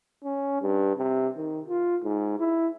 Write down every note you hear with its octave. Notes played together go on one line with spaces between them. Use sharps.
C#4
G2
C3
D#3
F4
G#2
E4